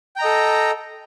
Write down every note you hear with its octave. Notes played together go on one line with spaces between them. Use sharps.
A4 D#5 G5 A#5